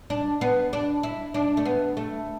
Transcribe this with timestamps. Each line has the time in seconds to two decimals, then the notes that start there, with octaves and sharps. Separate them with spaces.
0.10 D4
0.41 B3
0.73 D4
1.03 E4
1.34 D4
1.57 A3
1.65 B3
1.97 A3